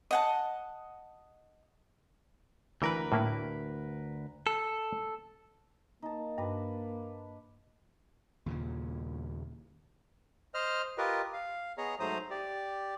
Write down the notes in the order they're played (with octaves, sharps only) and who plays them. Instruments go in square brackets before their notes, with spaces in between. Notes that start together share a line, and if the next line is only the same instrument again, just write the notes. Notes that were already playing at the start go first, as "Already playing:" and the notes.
[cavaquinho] D#5 F#5 A5
[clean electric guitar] D2 A#4 B4 [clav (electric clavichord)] E3
[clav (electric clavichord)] A2 A#3 E4
[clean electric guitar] A4
[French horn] A#3 [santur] D#4 A5
[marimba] G2 [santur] D4 B4
[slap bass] D#2 A#2 C#3
[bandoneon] C5 D#5 F6
F4 G4 A#4 B4 D#5
F5
B3 G#4 C#5 D#5 A#5
G#2 F#3 A3 C5 A#5 D#6
G4 D5